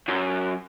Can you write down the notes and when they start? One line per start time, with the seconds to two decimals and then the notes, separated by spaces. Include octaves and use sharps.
0.08 F#2